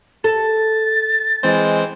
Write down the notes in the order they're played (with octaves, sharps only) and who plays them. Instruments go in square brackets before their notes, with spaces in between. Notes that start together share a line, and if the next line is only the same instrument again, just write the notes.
[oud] A4 [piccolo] A6
[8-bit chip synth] E3 C4 C5 [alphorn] G#3